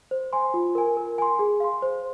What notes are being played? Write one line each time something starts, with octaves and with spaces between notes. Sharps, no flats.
C5
G#5 C6
F4
A#4 G#5
A#4
G#5 C6
G#4
F5 C6
C5